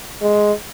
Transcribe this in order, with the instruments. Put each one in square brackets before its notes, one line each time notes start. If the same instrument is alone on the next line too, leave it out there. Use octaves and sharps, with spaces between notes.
[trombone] G#3